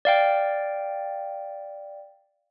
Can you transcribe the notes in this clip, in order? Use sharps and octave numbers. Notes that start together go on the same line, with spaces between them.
D5 F5 G5